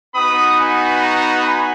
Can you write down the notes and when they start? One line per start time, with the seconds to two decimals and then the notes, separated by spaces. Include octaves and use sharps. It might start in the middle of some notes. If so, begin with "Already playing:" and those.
0.15 B3 D#4 F#4 B5 D#6
0.58 G#5 B5
1.01 F#5 A#5
1.43 G#5 B5